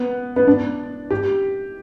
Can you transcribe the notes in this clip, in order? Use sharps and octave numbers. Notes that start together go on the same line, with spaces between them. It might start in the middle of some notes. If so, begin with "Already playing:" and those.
Already playing: B3
B3
D4
G4